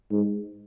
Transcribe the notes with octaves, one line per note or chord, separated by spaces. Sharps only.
G#2